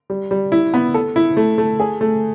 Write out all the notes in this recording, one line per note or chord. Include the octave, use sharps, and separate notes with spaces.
G3
G3
E4
B3
A4
E4
A3
A3
G#4
A3